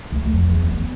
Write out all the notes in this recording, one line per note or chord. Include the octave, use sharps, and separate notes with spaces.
D2
F2
E2
B3